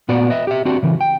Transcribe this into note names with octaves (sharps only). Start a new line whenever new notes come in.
A#2 B3 F#4 D5
B4 D#5 E5
G4 E5
C4 D4 F#4 G4
C#3 E3
G5